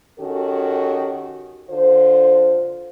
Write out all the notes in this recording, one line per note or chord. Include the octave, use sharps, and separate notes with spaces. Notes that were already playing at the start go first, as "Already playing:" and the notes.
D#3 C#4 F#4 G4 A4
D3 F4 C5